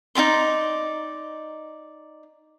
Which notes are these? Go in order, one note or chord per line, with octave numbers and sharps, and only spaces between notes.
D#4 F4 D5 C6